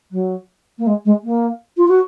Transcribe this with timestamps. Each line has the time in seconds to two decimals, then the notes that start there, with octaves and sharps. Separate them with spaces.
0.11 F#3
0.78 A#3
0.87 G#3
1.05 G#3
1.24 A#3
1.77 F4
1.88 F#4